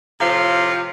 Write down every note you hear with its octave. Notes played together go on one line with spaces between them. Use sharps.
A2 C3 F3 F5